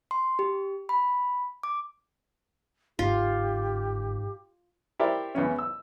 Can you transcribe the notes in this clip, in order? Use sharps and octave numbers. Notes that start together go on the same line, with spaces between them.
C6
G4
B5
D6
G1 G#2 F4 G4
E4 G4 A#4 C5 D5
E2 E3 C#4
E6